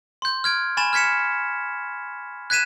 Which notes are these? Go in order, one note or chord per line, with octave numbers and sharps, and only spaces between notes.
C6 G6
F6 G#6 D7
G#5 B5 C#6 A6 E7
F6 G#6 B6 C#7 E7
F#6 G#6 B6 D#7 E7